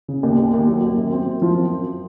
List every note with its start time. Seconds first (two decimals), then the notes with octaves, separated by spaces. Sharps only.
0.08 C#3
0.23 D#2
0.38 D#2
0.54 D#2
0.68 F#3
0.83 D#2
0.97 F#2
1.12 C4
1.27 F#2
1.42 F3
1.57 C4
1.72 F#2